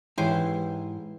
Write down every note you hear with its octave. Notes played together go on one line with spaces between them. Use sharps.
G#2 E3 E4 G4 C5 C#5